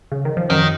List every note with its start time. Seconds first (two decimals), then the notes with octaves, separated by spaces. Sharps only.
0.11 C#3
0.25 D#3
0.37 F3
0.50 F#2 D#3 F#3